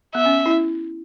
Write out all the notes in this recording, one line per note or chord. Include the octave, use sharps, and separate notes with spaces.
B3 E5
C#4
E4